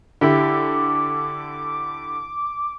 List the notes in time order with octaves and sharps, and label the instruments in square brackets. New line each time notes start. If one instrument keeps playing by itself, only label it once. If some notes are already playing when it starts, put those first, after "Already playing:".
[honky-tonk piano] D3 [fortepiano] E4 G4 [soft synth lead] D6